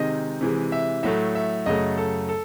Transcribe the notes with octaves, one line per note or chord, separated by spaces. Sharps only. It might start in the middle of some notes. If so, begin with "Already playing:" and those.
Already playing: C3 D#3 G#3 C4 D#4 D#5
C3 E3 G#3
E5
A2 F#3 A3 E5
E5
F#2 C#3 F#3 A3 D#5
A4
A4